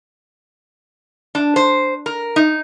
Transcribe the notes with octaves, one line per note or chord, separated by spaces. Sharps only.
D4
C5
A#4
D#4